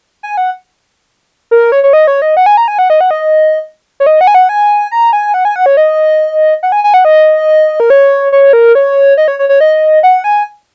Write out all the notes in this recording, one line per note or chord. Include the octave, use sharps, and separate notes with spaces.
G#5
F#5
A#4
C#5
C#5
D#5
C#5
D#5
F#5
G#5
A#5
G#5
F#5
D#5
F#5
D#5
C#5
D#5
F#5
G#5
F#5
G#5
A#5
G#5
F#5
G#5
F#5
C#5
D#5
F#5
G#5
G#5
F#5
D#5
A#4
C#5
C#5
A#4
C#5
D#5
C#5
C#5
C#5
D#5
F#5
G#5